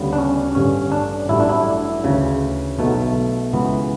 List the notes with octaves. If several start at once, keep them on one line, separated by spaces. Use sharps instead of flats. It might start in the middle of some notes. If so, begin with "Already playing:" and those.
Already playing: D2 C#3 G3 B3
D4
C#4
A1 G2 D3 C#4
D4
A1 G2 F#3 A3 E4
D4
E4
D2 C#3 E3
B1 B2 A3
C#2 C#3 E3 B3